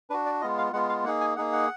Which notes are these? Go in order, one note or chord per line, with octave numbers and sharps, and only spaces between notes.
D4 F#4 B4
D5
G#3 B3 F4 D#5
F5
G#3 B3 F4 F#5
F5
A#3 D#4 G#4 F#5
G#5
A#3 D#4 G#4 F#5
F#5